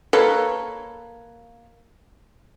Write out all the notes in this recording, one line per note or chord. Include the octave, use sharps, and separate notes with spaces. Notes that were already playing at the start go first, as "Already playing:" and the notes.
A#3 A4 B4 C#5